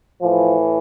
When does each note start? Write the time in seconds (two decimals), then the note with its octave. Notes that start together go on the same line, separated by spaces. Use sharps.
0.22 A2 E3 F3